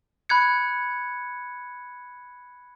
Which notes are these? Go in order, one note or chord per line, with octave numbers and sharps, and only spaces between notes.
B5 F#6 G#6 C#7